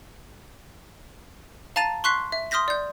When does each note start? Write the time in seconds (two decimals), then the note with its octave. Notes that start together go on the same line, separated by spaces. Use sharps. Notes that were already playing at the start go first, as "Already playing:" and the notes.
1.76 F5 A5 A#5 A6 D#7
2.04 C6 C#6 F#6 B6 C7
2.32 E5
2.51 C6 D#6 F6 G6 A#6 B6
2.68 D5 G6